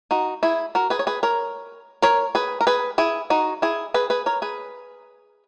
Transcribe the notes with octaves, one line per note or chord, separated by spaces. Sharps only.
D#4 F#4
E4 G#4
F#4 A#4
G#4 B4
C#5
G#4 B4
A#4 C#5
A#4 C#5
G#4 B4
A#4
G#4 B4
E4 G#4
D#4 F#4
E4 G#4
G#4 B4
G#4 B4
A#4 C#5
G#4 B4